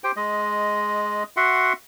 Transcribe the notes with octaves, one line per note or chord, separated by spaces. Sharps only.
G4 C5 G5
G#3 D#5
F#4 E5 F#5 C6